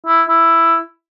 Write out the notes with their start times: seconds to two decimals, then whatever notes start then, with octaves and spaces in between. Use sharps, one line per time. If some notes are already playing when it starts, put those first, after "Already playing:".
0.06 E4
0.29 E4